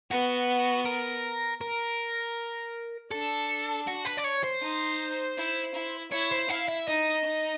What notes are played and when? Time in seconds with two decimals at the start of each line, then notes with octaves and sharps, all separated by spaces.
0.11 B3 F#4
0.85 A#4
1.61 A#4
3.11 D4 A4
3.88 F#4
4.05 B4
4.18 D5
4.25 C#5
4.44 C5
4.62 D#4
5.38 E4
5.75 E4
6.12 E4 C#5
6.32 C5
6.50 E4 F5
6.69 E5
6.88 D#4 D#5
7.25 D#4